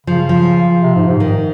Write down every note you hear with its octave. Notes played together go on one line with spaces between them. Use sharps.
C#3 F3
F3
C3
G#2
G#2
D#3